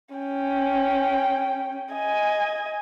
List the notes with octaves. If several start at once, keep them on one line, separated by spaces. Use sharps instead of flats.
C#4 G5
D#5 G#5